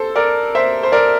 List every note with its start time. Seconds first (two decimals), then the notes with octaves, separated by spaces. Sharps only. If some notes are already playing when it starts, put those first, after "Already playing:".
Already playing: A4 C5
0.16 A#4 D5
0.55 C5 E5
0.83 C5
0.92 A#4 D5